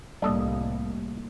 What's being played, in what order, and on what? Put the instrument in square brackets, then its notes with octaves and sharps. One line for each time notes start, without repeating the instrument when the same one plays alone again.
[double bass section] C2 A2 [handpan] G3 A#3 [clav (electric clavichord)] D4 A4 D#5